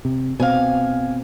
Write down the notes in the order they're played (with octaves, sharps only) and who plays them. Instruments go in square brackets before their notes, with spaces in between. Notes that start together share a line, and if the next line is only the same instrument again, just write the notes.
[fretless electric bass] C3
[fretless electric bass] B2 C4 [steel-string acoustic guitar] F5 G#5